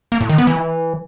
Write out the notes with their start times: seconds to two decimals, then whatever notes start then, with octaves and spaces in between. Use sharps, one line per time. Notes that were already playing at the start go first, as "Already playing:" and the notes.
0.12 A#3
0.21 A2
0.29 D#3
0.38 B3
0.47 E3